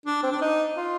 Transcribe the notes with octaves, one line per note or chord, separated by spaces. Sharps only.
D4
C4
D4
D#4
F4